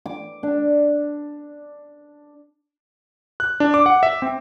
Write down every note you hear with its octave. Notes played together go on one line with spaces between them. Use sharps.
D6
D4
F#6
D4
D6
F#5
E5
C4